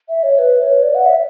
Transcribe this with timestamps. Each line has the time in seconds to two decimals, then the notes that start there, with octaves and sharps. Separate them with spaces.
0.09 E5
0.23 C#5
0.39 B4
0.61 C#5
0.83 D5
0.95 F#5
1.06 E5